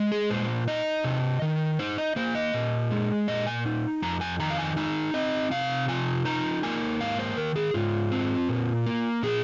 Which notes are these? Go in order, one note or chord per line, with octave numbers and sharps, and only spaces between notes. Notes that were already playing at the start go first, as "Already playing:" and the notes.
Already playing: G#3
G#4
A#2 C5
D#4 D#5
C3
D#3
D#4 C5
D#5
A#3 C5
D#5
A#2
G#3
A#2 D#5
G#5
D#4
F2 A#5
G#5
D#3 A#5
F5
G#5
D#4 G#5
C4 D#5
C3 F5
F3 G#5
D#4 A#5
A#3 G#5
G#2 F5
C5
D#3 A#4
G#4
G#2 F4
C4
A#2
A#3
A#2 G#4